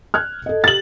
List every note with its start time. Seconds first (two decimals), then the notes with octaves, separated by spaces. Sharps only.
0.14 F6 F#6 G#6
0.46 A4 D#5
0.64 G4 F6 A6 F#7